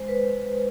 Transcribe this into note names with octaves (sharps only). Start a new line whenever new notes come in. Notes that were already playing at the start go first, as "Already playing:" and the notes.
Already playing: G#3 C5
B4